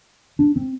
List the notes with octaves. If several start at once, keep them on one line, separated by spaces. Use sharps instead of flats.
D4
C4